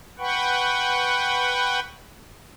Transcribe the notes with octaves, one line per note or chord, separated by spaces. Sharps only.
B4 F#5 G5 B5 C#6